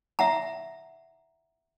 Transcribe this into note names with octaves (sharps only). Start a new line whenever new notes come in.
E5 F#5 A#5